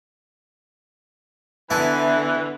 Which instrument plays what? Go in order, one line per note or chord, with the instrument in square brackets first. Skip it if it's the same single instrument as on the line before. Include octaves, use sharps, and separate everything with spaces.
[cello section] D3 B3 [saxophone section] E3 [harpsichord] E4 G#5 A5